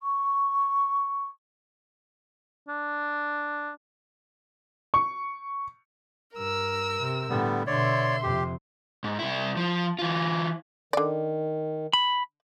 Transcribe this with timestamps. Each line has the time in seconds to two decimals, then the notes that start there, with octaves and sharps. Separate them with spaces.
0.01 C#6
2.68 D4
4.94 C#6
6.35 G2 A#4 E6
7.00 C3
7.30 A2 D3 G3 B3
7.67 B2 D3 C#5 D5 E5 C6
8.23 F2 C3 G4
9.04 G#2
9.19 C2 E4
9.56 F3
9.99 E3 F4
10.93 D3 D#3 D5
11.93 B5